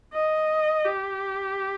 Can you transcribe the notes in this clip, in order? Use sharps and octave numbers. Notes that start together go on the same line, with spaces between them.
D#5
G4